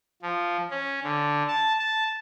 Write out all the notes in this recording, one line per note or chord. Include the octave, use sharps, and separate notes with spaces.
F3
C#4
D3
A5
A5